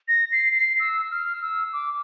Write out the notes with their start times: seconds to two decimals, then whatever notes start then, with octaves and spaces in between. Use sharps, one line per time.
0.08 A#6
0.32 C7
0.56 C7
0.80 E6
1.11 F6
1.42 E6
1.73 D6